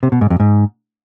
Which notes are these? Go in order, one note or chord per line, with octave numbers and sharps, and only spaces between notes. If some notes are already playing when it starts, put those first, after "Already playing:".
C3
B2
G#2
F2
G#2